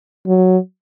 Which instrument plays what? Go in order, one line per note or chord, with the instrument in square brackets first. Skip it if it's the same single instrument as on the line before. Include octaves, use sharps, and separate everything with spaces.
[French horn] F#3